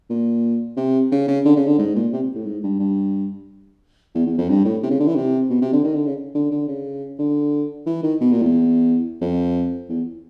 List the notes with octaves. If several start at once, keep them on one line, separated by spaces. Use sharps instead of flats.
A#2
C3
C#3
C#3
D3
C#3
D3
G#2
A#2
C3
A2
G#2
G2
G2
E2
E2
F2
G2
A2
C3
C#3
D3
E3
C3
B2
C3
D3
D#3
D3
C#3
D3
D3
C#3
D3
E3
D#3
B2
A#2
E2
F2
E2